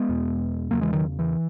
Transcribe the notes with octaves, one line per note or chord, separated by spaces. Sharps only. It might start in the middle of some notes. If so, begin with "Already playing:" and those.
Already playing: G#3 B3
E2 B2
E2 C#3 F#3 A#3
E3 G#3
D#3 F#3
E3